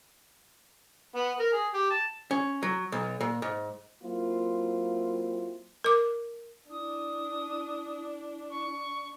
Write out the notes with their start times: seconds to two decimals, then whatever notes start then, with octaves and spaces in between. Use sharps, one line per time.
1.15 B3
1.40 A#4
1.53 G#4
1.74 G4
1.91 A5
2.31 C#4
2.63 F#3
2.92 B1
3.21 A#2
3.42 G#2
4.03 F#3 A#3 C4 E4 F4
5.84 A#4 D6
6.70 D4 E4 D#6
8.50 C#6